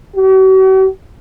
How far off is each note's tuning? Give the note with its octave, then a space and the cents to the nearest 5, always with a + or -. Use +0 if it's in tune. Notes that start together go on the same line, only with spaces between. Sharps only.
F#4 +45